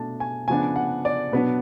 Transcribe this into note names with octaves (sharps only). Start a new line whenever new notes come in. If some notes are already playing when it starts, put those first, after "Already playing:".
Already playing: B2 A3 D4 A5
G#5
C#3 F3 B3 D4 G#5
F#5
D5
B2 F#3 B3 D4 B4